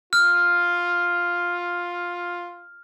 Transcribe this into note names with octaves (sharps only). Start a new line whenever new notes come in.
F4 F6